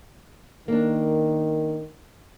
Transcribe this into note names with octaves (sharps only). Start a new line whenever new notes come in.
D#3 A#3 D4